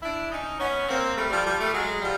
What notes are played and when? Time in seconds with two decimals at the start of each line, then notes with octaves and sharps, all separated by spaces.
0.02 D4 E4
0.31 C#4 D#4
0.59 B3 C#4
0.88 A#3 C4
1.16 G3 A3
1.30 F3 G3
1.45 F3 G3
1.59 G3 A3
1.73 F#3 G#3
2.01 F3 G3